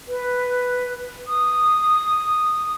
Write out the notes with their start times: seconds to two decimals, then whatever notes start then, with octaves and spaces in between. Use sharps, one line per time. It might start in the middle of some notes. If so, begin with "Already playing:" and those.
0.08 B4
1.27 D#6